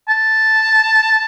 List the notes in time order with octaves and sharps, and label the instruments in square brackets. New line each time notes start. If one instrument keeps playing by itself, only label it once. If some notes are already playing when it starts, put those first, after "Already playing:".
[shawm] A5